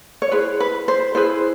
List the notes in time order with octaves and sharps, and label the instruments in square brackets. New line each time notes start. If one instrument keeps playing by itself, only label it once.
[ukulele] C#5
E4 G#4 B4 C5
B4
C5
E4 G#4 B4 C5